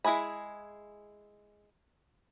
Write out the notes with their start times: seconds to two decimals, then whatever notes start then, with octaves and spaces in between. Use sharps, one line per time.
0.05 G#3 E4 G#4 G#5 B5